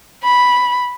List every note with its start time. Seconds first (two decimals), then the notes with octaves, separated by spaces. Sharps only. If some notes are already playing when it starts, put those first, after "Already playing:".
0.23 B5